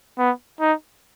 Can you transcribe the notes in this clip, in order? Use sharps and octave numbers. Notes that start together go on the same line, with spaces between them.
B3
D#4